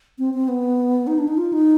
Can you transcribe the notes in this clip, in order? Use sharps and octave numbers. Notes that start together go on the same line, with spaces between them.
C4
C4
B3
D#4
D4
D#4
F4
D#4